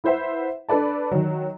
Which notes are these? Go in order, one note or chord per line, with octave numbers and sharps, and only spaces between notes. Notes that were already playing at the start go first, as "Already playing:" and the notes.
E4 B4 C5 E5 F#5
D4 A4 B4 D5 A5
D#3 F#3